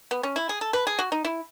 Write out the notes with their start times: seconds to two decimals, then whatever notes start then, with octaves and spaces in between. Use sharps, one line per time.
0.11 B3
0.23 C#4
0.36 E4
0.49 G#4
0.61 A4
0.73 B4
0.87 G#4
0.99 F#4
1.12 D#4
1.25 E4